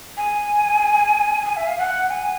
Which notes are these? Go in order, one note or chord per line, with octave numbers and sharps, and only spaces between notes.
G#5
G#5
E5
F5
F#5
G#5